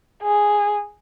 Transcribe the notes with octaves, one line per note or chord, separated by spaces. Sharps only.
G#4